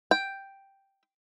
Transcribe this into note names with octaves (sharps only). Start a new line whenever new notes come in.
G5